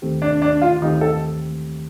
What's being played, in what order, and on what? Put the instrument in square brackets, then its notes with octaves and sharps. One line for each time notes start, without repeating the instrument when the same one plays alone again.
[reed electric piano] D#2 D#3 A3 C4 G4
[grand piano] D4
D4
F4
[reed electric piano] D#2 D#3 A3 C4 G4 [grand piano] D#4
[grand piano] A4